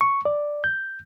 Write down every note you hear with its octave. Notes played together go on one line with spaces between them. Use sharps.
C#6
D5
G6